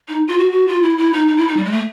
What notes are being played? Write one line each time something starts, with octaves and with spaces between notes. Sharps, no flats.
D#4
F4
F#4
F#4
F4
E4
E4
D#4
D#4
E4
D#4
G3
G#3
A3